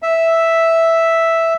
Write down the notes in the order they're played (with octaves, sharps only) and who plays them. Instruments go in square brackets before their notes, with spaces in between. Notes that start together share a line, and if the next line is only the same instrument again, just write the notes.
[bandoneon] E5